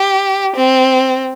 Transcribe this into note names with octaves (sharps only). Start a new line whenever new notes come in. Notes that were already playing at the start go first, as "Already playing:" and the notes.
Already playing: G4
C4